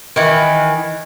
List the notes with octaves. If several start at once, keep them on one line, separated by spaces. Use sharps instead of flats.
D#3 E3 B4